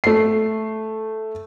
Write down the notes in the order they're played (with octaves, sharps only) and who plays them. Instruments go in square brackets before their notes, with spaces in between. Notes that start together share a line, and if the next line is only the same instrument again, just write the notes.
[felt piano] A3 C7